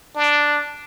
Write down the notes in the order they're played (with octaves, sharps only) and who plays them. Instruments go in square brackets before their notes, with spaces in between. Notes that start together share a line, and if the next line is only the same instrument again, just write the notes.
[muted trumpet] D4